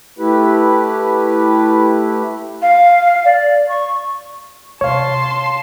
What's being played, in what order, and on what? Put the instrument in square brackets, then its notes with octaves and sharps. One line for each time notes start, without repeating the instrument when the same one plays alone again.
[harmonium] A3 E4 G4 B4
[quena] F5
D5
C#6
[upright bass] C3 [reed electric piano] C#5 F5 [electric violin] A5 C6